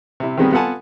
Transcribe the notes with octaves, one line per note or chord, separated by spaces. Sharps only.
C3 E4
D#3 F3 G3 G#3 B3
B3 F4 A4 F#5 G#5 A5